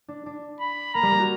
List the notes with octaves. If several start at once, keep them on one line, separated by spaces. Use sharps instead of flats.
D4
D4
B5
A#3 A#5
G3
A#3
F#4